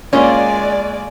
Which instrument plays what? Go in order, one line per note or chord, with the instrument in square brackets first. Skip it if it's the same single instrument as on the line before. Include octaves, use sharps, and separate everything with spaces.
[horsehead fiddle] G#3 G#5 [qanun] A#3 F4 D#5 [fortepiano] C#4 [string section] D5